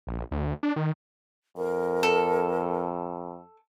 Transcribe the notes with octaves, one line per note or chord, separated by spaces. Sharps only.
A#1
D2
D4
D#3
F2 A#4
A4